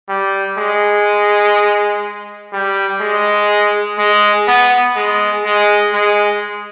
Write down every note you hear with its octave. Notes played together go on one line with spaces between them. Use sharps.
G3
G#3
G3
G#3
G#3
B3
G#3
G#3
G#3